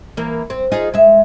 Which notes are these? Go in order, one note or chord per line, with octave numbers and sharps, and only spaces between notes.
E3 A#3
C4
D#4 F4 G#4
G#3 E5